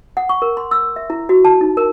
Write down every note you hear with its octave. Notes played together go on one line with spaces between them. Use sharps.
F#5
C#6
A#4
C6
E6
E5
E4
F#4
A5
D#4
A#4